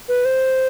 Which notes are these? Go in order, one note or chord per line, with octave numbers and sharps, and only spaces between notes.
B4
C5